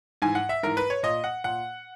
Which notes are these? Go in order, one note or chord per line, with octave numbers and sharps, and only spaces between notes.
G#2 E3 G#5
F#5
E5
G#2 E3 A#4
B4
C#5
A#2 D#5
F#5
A#2 F#5